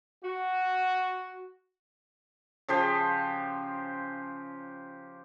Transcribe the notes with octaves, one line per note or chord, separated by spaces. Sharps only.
F#4
C#3 F3 G4 C5